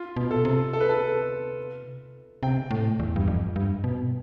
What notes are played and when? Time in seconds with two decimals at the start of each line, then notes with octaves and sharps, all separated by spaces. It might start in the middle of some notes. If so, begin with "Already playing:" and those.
Already playing: F4
0.16 B2
0.31 A4
0.45 C3
0.73 A4
0.80 B4
0.89 A4
2.43 C3 G5
2.71 A2
3.00 E2
3.16 G2
3.28 F2
3.56 G2
3.84 B2